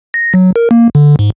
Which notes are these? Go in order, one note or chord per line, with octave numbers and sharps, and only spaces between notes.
A#6
F#3
A#4
A#3
D3
G#2